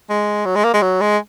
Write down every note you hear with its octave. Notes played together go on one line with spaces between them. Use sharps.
G#3
F#3
G#3
A#3
G#3
F#3
G#3